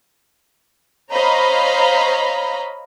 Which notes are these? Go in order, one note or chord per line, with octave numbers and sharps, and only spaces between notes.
C5 C#5 D#5 F5 A#5 B5